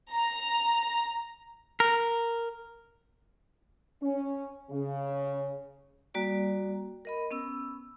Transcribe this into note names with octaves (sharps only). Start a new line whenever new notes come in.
A#5
A#4
C#4
C#3
G3 A#3 F#4 D5
A#4 D#5 B5
B3 C#4 E6